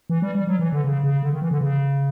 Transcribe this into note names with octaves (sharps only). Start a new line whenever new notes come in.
E3
G3
G3
F#3
E3
D3
C#3
C#3
D3
D#3
E3
D3
C#3